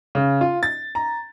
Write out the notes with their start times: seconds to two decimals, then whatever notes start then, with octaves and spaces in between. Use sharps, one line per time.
0.15 C#3
0.41 F4
0.63 A6
0.95 A#5